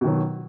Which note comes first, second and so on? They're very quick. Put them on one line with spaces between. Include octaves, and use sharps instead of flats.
B2 D#3 F#3